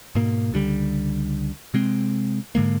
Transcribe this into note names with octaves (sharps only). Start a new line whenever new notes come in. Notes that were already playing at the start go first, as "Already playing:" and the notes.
G#2 B2 A#3
C#2 D3 F3 G3
C3 G#3 C4
G#2 D3 G#3 A#3